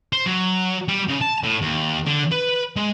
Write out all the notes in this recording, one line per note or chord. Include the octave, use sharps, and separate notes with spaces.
C5
F#3
G3
C#3
A5
A2
D#2
D3
B4
G#3